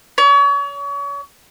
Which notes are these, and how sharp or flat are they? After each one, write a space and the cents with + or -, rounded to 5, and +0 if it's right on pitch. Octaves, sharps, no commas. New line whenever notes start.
C#5 +35